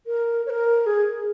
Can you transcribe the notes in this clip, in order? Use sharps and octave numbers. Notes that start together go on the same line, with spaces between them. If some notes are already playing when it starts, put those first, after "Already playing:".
A#4
C#5
A#4
G#4